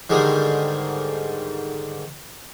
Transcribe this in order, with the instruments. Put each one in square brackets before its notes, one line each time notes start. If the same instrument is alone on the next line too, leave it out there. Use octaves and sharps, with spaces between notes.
[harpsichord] G#2 D3 D#3 G3 G#3